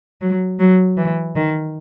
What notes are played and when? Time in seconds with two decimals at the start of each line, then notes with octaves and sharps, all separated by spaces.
0.21 F#3
0.59 F#3
0.97 E3
1.36 D#3